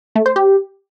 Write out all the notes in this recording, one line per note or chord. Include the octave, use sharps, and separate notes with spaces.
A3
C5
G4